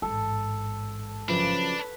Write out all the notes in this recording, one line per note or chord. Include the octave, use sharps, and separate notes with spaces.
A1 G#2 A4
F#2 C#3 F3 D4 B4